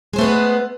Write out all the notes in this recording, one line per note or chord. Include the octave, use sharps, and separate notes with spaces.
G#3 A3 B3 B4 C5